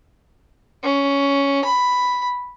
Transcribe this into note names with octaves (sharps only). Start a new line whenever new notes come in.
C#4
B5